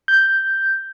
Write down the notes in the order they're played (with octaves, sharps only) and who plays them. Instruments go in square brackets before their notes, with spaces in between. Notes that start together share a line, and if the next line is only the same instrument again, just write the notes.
[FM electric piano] G6